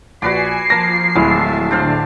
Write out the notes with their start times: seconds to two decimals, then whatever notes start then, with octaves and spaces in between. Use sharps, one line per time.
0.22 A#1 F#4 B4 D5 G#5 C7
0.70 F3 A#3 A5 A#6
1.16 D1 G#3 E4 E5 A5 B5
1.71 A2 D3 D4 C5 F5